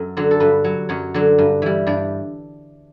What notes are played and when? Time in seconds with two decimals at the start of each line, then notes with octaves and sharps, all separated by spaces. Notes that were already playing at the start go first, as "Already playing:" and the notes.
Already playing: F#2 A4
0.17 D3 F#3
0.31 A4
0.40 G2 B4
0.64 F#3
0.89 F#2 C#5
1.14 D3 F#3
1.38 G2
1.62 E3 G3
1.87 G2 D5